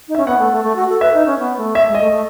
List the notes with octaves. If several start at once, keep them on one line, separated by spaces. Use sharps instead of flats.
D#4
E5
C#4
B3 F#5
A3
A3
A3
F#4
A4
B4 E5
D#4
C#4
B3
A3
E5
G#3
D#5
A3
A3